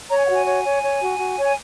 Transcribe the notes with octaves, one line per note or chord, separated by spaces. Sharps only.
C#5 A#5
G#5
F#5
F#4 G#5
C#5
C#5
C#5
F#4
F#4
C#5
G#5